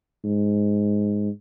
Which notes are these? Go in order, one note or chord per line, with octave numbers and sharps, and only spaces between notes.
G#2